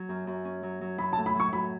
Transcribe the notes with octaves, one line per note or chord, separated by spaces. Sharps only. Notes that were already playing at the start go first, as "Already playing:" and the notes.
Already playing: F#3
F#2
F#2
C#4
F#3
F#3
F#3 B5
A5
A2
B5
F#3 C#6
F#3 B5